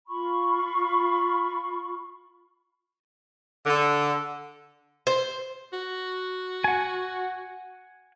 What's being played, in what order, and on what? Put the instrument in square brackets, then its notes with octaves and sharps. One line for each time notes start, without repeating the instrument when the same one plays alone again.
[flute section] F4 B5 C#6
[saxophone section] D3
[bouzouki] C5
[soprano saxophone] F#4
[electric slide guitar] F#5 G#5